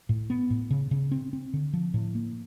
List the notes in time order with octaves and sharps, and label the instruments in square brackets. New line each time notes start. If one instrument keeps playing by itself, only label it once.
[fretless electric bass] A2
B3
A2
C#3
C#3
C4
C4
D3
F3
A2
A#3